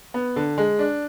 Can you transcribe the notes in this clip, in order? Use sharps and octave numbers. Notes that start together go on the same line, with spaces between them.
B3
D3
G#3
D4